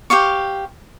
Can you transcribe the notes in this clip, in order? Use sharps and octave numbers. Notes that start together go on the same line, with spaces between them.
G4 C5 F5 C#6